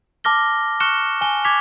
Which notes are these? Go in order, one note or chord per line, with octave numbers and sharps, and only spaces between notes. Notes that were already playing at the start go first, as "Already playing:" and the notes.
A5 D6 F6 A#6 G7
C#6 F6 F#6 C#7 E7 G7
G#5 G7
D6 G#6 B6 F7